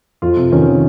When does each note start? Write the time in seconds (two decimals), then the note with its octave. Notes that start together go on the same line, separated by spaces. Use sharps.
0.22 F2 F4
0.37 C3
0.52 D#3 C#4